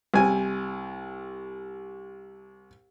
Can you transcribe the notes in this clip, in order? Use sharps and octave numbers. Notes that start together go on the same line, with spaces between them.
C2 G#5